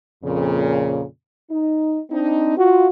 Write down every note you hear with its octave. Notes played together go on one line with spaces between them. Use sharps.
F2 A#2 C#3
D#4
C4 D4 D#4
F4 F#4